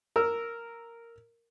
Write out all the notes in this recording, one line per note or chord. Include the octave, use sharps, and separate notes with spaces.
A#4 E6